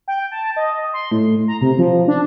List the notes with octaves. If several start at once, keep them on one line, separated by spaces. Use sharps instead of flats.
G5
A5
D#5
C6
A2
A#5
C3
F3
D4